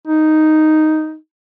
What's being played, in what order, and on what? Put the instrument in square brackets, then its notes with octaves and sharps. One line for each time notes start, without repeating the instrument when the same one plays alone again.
[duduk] D#4